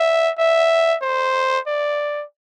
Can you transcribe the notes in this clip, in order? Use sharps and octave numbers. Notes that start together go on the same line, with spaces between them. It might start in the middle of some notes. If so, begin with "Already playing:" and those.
Already playing: E5
E5
C5
D5